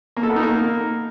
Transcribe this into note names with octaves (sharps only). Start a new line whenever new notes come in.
A#3
A4
B3
D#4
A#3